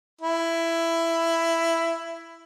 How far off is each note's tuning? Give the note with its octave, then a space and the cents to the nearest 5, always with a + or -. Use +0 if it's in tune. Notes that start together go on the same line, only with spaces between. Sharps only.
E4 +10